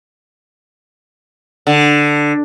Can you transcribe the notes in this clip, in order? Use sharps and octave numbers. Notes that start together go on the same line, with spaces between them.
D3